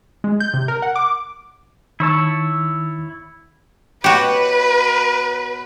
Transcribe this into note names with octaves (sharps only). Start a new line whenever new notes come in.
G#3
G6
C3
A#4
F#5
D6
D#3 E4 C#5 A5 E6
B2 F#4 G4 B4 C#5